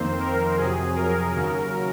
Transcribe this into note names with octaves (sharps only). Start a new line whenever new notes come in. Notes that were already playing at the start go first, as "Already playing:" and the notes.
Already playing: F2 D#3 A#3 C4 C5
A#4
F2 C3 F#3 G#4
A#4
D#2 C#3 F#3